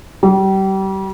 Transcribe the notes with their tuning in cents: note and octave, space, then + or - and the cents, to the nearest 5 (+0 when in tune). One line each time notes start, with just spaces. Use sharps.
G3 -30